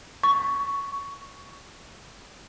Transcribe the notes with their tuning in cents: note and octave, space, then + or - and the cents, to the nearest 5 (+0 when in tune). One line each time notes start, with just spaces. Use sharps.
C#6 +10